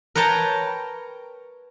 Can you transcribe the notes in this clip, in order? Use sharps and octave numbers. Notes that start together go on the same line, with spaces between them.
A#4 B4 C#5 G5 A5 A#5